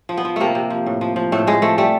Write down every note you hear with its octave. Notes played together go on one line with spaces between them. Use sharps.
F3
B3
F3
C3 A3 A#3
C3
F3
A2
F3
F3
A2 A3
A2 G#3
F3 A3
G3 A3